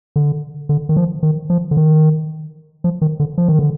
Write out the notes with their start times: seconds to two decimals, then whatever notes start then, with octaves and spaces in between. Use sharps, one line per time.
0.16 D3
0.69 D3
0.89 D#3
0.97 F3
1.23 D#3
1.50 F3
1.71 D3
1.77 D#3
2.84 F3
3.02 D#3
3.20 D3
3.38 F3
3.48 D#3
3.59 D3